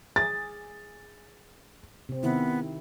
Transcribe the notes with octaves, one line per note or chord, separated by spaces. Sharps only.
G#4 A6
C3 C4
C3 D#3 B3 E4